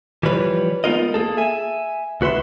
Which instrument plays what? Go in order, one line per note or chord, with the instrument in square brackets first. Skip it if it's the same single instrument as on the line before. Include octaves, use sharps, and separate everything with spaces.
[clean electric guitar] E3 F3 G3 B4 C#5
G#3 B3 D#4 F4 A#4 D#5
A#3 G#4 A4
E5 G#5
C#2 F#4 B4 E5 C6